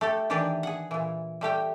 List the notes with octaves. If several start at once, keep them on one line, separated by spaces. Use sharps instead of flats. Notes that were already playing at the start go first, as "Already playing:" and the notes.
A3 G4 A4
D#3 E3 D4 G4 B4 D5
G#4 F#5
A#2 E3
G3 A3 G4 G5